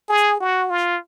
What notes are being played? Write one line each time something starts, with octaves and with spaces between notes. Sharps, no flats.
G#4
F#4
F4